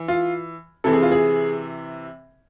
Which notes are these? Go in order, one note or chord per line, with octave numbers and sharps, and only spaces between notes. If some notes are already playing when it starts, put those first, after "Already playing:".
Already playing: E3
F4
C3 E3 A4
G#4
F4
G#4